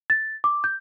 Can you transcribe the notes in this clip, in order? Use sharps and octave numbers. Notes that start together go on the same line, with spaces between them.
A6
D6
G6